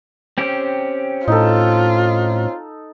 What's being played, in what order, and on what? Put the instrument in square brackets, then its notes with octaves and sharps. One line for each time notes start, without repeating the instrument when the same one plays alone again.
[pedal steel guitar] C4 C#4 G4
[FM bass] A2 [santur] D#4 A4 [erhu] F4